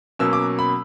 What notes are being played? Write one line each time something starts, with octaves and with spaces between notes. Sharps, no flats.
B2 F#3 A#3 C#4 E6
D6
B5